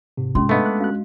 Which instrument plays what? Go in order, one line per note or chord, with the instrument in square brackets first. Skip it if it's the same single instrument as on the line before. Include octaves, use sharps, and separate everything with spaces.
[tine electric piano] G#2 C3
[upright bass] G#3 [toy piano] C#4 F4 C6
[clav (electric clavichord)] A3 B3 [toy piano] D4 D#5 F5
[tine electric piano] D6 F#6
[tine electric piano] C#4 F#6 [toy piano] F#4 F5